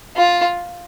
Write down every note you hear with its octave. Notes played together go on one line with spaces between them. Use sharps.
F4